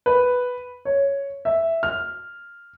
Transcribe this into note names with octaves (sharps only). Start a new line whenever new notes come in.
B4
C#5
E5
F6